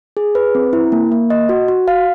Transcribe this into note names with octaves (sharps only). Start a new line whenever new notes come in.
G#4
B4
C4
E4
A#3
A#3
D#5
F#4
F#4
F5